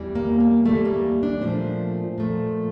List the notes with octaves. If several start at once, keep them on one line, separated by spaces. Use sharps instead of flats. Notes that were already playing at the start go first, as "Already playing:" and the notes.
Already playing: E2 E3 G3
A#3
A#3
E2 E3 G3 A3
A#3
D4
A#2 F3 A3 C5
A#2 F3 A3